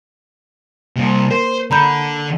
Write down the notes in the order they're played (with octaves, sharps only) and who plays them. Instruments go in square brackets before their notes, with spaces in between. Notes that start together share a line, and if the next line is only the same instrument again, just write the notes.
[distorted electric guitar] C2 C3 [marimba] A#3
[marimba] A#4 [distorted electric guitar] C5
[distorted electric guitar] D3 [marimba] A#5 B5 G6